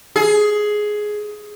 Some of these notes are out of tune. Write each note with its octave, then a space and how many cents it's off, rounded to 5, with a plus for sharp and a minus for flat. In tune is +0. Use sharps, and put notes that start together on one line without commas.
G#4 +10